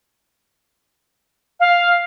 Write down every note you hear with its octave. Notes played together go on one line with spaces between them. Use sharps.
F5